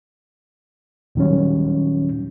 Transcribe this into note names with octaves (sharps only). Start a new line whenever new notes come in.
D#2 A#2 D#3 F#3 G3 C#4